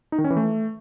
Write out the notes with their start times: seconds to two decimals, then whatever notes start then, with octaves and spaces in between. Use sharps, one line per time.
0.12 D#4
0.18 D#3
0.24 C#4
0.30 E3
0.37 A3